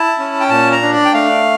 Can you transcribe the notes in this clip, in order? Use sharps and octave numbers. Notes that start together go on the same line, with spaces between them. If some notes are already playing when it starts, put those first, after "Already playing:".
Already playing: E4 A5
C#4
G5
A#2 A5
A#5
D4
D5
G5
A3 F5